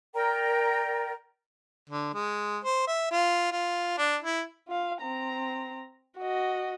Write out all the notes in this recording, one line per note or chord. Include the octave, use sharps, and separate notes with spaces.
A#4 D5 G5 A#5
D3
G#3
C5
E5
F4
F4
D4
E4
F4 F5
C4 A#5
F#4 D#5